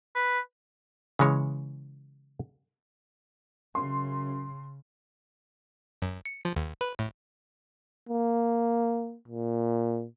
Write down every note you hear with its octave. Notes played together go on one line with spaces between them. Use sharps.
B4
C#3 E3 G#3 C#5
F#2 C#3 C6
F#2
C#7
F3
D#2
B4
A2
A#3
A#2